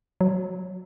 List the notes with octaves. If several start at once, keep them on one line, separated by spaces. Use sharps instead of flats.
F#3